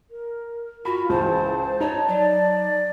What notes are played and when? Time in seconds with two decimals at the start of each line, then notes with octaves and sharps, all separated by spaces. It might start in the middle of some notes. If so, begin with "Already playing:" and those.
0.10 A#4
0.85 F4 F#4 B5
1.09 C#2 E3 C5 A5
1.80 D#4 C#5
2.08 F#3 D5